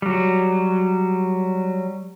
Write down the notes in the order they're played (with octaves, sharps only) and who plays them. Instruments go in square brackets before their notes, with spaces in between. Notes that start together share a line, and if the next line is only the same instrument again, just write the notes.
[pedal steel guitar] F#3 G3